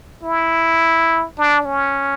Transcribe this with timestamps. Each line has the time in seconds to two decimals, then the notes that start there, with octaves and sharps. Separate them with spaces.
0.23 E4
1.38 D4
1.65 C#4